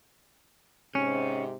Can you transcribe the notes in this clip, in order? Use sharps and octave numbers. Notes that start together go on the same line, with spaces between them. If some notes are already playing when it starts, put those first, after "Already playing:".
G#2 C3 C#4